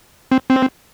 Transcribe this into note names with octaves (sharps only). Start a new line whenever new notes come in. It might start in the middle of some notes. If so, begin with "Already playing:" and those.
C4
C4